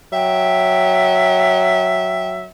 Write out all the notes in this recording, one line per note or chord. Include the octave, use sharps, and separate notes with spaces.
F#3 E5 G5